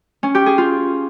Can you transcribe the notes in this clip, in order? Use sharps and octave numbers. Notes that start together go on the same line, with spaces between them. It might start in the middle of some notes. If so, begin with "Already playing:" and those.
C#4
G4
G#4
F4